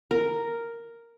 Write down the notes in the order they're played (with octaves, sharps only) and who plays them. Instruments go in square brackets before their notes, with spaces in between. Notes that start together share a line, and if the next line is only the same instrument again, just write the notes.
[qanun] A#4